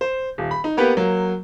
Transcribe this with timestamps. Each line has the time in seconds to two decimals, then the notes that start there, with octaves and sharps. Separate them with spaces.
0.01 C5
0.38 D#1
0.51 B5
0.64 D#4
0.77 A#3 B3 G4 B4
0.97 F#3 A#3